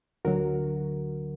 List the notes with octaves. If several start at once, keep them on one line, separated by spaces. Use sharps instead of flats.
D2 D3 F#3 F#4 A#4